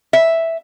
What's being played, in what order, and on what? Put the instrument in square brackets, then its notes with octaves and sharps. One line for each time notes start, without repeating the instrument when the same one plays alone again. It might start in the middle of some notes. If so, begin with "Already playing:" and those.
[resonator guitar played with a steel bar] E5